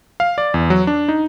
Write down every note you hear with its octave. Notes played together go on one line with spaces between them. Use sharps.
F5
D5
E2
F#3
D4
D#4